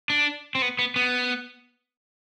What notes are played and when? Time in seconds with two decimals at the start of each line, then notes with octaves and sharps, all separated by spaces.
0.10 D4
0.55 C4
0.62 B3
0.79 B3
0.96 B3